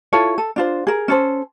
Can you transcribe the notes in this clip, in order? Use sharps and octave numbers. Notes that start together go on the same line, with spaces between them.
E4 F4 A4 C#5
A4
D4 F4 C5
G#4 A#4
C#4 A4 C5